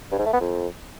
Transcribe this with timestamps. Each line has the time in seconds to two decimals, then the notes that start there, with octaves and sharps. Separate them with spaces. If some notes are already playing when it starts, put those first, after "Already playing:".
0.11 G2
0.19 G#2
0.26 A3
0.33 B3
0.40 F2